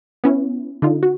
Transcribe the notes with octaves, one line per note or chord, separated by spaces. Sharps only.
B3 C#4 E4
D3 D#4 F4
F#4